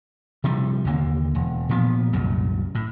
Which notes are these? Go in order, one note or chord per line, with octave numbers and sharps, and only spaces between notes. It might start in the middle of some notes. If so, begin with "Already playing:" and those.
C3 E3 F3 G3
D#2 D3 A3 A#3
E1
A#2 F3 G#3 B3
C2 F#2 A#2
A2